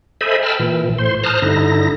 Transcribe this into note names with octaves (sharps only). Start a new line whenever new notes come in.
A4 C5 D#5 E5 G#5 B5
G5 A5 B5 E6 F6
A#2 E3
A2 C5 C6
C5 A5 A#5 D#6 F6 F#6
G2 D3 D#4 E4 A#6